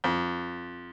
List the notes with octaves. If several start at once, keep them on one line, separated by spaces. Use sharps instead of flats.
F2